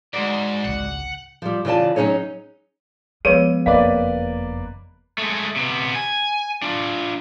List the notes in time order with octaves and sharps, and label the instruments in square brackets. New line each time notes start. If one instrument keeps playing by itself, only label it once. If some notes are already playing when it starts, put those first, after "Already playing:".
[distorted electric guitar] G#2 [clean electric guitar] G#3 F#4 D5
[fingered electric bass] G#1 C#2 [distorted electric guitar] F#5
[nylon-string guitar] F3 G3
C#3 E3 F4 D5 A5
F#3 C#4 D#4 G#4 C#5
[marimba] F3 B3 E6 [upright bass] G#3 [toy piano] G#4 B4 C#5 [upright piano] D#7
[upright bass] F#1 F2 [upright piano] A#3 B4 D5 [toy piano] D#5 F5
[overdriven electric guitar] G#3 A3
C3 B3
G#5
D4 F4